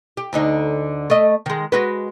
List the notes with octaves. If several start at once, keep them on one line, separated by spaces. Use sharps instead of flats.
G4
D2 D3 D#4
A3 D#5
D#3 G#3
G#3 F#4 B4